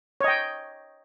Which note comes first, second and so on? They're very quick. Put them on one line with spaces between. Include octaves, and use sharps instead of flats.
C#5 D#5 G5